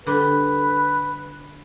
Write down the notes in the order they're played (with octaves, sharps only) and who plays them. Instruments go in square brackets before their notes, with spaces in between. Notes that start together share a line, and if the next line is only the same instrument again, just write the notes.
[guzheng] D3 G3 [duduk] B4